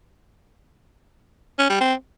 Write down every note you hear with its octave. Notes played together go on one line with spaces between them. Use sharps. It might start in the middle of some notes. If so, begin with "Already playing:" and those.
C#4
G3
C4